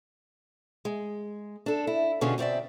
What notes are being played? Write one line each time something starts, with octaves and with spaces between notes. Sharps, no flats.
G#3
D4 A4
E4
B2 D3 C#4 F4 F#4 G#4
B2 C4 D4 D5 E5